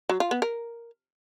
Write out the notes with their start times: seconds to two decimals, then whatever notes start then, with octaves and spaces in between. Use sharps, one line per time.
0.09 F#3
0.20 F4
0.31 B3
0.42 A#4